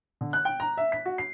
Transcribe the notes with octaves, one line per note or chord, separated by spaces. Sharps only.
D3
F#6
G5
A#5
E5
B6
F#4
C7